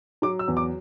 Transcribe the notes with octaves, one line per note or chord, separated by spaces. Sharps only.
F#3 D6
E6
E2
D6